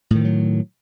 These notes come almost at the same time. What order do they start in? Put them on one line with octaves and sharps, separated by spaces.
A2 D#3 F3 F#3